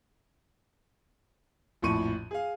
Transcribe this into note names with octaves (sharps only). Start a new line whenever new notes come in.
A#1 F2 A2 C#6 D#7
G#4 F5